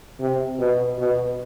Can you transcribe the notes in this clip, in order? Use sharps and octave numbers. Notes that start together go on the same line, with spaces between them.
C3
B2
B2